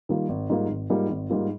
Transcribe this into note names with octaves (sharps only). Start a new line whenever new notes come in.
D#3 G3 A#3 F4
G#1
G#2 G3 A#3 F4
G#1
G#2 G3 A#3 F4
G#1
G#2 G3 A#3 F4